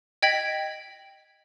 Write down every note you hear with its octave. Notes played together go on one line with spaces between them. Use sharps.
D#5 G5 G#6 B6 F#7